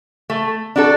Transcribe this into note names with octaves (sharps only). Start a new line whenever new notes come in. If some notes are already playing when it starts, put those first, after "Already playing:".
A3
D4 F#4 A4